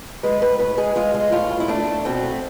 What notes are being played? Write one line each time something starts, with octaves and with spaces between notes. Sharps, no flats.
G#3 B4
A2 B4
A2 B4
G#3 G#4
G#3 F4
G#3
A2 F4
A2
E4
A3 D4
A3
B2 C4
A3